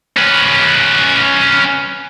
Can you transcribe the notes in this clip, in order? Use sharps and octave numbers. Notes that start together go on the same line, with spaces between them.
C#4 B4